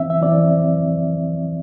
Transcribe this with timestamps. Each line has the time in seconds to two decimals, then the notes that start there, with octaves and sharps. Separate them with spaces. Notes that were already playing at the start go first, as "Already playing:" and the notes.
Already playing: E3 C4 E5
0.10 E5
0.21 E3 C4 D5